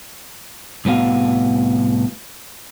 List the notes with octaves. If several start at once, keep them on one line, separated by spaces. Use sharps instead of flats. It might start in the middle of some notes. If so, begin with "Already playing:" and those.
C2 A2 B3 F#4 F5